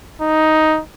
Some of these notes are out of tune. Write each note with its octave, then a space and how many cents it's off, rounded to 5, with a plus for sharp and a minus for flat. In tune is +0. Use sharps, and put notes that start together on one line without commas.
D#4 +5